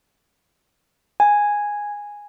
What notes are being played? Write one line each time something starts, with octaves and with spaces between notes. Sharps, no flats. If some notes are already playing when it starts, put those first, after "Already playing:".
G#5